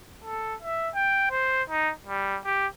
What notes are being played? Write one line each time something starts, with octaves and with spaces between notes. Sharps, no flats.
A4
E5
G5
C5
D#4
G3
G4